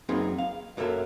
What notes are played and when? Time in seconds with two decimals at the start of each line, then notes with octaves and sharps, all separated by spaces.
0.09 F#2 A#3 C4 D#4 G#4 B4
0.38 F5
0.77 F#2 F#3 A#3 E4 A4 E5